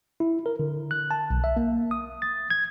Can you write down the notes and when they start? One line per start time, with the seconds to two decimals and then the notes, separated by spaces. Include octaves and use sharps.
0.20 E4
0.46 A#4
0.59 D3
0.91 F#6
1.11 A5
1.30 B1
1.44 E5
1.57 A#3
1.91 D#6
2.22 A6
2.50 G#6